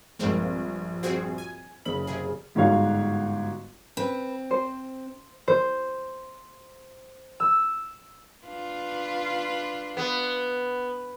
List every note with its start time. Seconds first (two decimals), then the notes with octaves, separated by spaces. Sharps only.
0.19 A#1 G2 G#3 A#3 C4
1.03 C4 F#4 G#4
1.38 G#5
1.85 F#1 C#3 B5 F#7
2.07 C3 G#4
2.55 G1 G#2 F#4 C#5 F5
3.97 C4 B4
4.51 C5
5.48 C5
7.40 E6
8.47 D4 F4 B4
9.97 B3